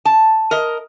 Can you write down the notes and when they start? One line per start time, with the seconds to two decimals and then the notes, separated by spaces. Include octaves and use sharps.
0.05 A5
0.51 A#4 D#5